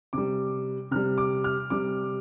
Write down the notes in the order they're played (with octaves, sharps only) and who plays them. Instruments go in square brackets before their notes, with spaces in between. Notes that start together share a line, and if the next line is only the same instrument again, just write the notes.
[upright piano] C3 G3 D6
C3 G3 F6
D6
F6
C3 G3 D6